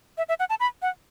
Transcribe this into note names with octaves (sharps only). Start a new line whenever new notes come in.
E5
E5
F#5
A5
B5
F#5